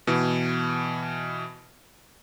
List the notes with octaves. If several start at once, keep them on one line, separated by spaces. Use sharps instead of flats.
B2 E3